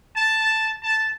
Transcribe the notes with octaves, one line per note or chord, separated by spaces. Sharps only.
A5
A5